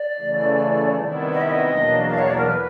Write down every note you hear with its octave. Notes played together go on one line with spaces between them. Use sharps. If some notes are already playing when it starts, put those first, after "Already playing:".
Already playing: D5
C#3 E3 A3
C3 D#3 G3 B3 E4
D#5
E5
D#5
E2 B2 F#3 A#3 D4
F5
C#5
D5
A#4
B4